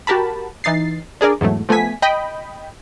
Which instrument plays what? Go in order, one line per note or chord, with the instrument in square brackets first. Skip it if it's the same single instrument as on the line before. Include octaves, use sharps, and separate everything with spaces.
[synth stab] F#4 G4 A#4 A5 B5
E3 D#4 A6 C7
D4 G#4 A#4 D5
E2 G#2 F#3 A3
F3 A3 B3 G#5 B6
D#5 G5 B5